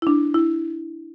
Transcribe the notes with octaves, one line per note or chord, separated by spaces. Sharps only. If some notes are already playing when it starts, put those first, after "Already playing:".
E4
D4
E4